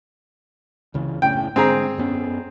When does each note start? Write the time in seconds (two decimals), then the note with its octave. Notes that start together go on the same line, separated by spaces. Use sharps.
0.94 C#2 C#3 E3
1.22 F#1 A2 C#3 G5
1.56 G#2 D3 C4 G#4 A#5
1.98 F#2 B3 C#4